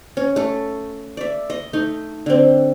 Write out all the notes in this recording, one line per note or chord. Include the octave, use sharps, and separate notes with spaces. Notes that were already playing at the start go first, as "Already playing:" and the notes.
C#4
A3 A4
D5 E5
D#5
A3 D#4
D3 C4